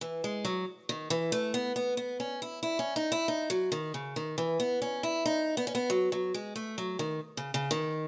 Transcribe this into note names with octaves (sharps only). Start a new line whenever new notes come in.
E3
G#3
F#3
D#3
E3
A3
B3
B3
B3
C#4
E4
E4
C#4
D#4
E4
D#4
F#3
D#3
C#3
D#3
E3
B3
C#4
E4
D#4
B3
C#4
B3
F#3
F#3
G#3
A3
F#3
D#3
C#3
C#3
D#3